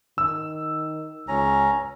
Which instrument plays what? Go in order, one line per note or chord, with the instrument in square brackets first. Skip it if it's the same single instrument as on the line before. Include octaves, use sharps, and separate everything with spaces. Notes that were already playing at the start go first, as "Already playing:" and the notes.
[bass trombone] D#3 [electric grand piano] E6
[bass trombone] C#2 [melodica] C#4 A#5